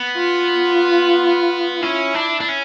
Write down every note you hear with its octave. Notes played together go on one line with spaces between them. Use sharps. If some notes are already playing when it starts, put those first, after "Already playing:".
Already playing: B3
F4
C#4 E4
D4
D4
C#4